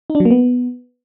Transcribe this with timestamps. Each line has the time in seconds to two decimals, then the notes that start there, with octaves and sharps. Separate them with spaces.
0.10 D#4
0.15 D4
0.20 F#3
0.25 A#3
0.31 B3